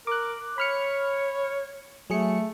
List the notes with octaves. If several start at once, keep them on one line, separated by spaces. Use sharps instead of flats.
A#4 D6 F#6
C#5 B5 F6 C#7
F#3 A3 G#4 C#7